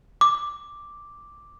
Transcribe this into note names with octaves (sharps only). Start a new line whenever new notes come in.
D6